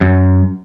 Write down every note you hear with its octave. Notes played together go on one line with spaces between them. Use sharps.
F#2